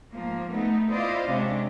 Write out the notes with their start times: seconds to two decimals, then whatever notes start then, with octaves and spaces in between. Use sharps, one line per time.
0.12 G#2 F3 A#3
0.52 A3 B3 D#4
0.89 E4 F4 C5 D5 D#5 F5
1.28 C3 G#3 C#4 D4